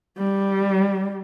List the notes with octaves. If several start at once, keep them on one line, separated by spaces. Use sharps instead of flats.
G3